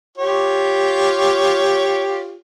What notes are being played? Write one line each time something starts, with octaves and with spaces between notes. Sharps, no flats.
F4 G4 C#5